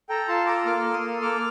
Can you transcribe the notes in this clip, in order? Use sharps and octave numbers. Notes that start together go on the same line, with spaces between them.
A4 G5 A#5
F4 A5 C6
A4 A#5 D6
A#3 D6 F6
A#3
C6 D#6
A4
A#3 D6 F6